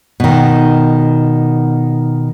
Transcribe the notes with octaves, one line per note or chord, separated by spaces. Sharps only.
B2 D#3